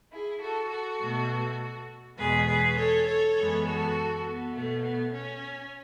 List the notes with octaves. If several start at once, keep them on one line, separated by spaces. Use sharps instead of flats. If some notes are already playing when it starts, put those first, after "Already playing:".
E4 G#4
F#4 A4
F#4 A4
B2 A3
E2 B2 G#3 G#4 B4
G#4 B4
A4 C#5
A4 C#5
F#2 E3 G#3 B3
F#4 A4
B3
B2 A3
B3
C#4